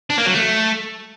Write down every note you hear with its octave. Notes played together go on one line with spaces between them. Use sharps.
D4
A#3
F#3
A3